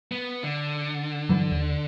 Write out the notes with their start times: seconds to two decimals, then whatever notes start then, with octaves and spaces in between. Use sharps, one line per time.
0.12 B3
0.44 D3
1.29 G2 E3 F#3
1.52 D#2